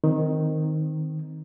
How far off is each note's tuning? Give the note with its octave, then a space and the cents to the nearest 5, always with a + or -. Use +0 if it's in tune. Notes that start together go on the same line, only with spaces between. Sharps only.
D#3 +0 C4 -10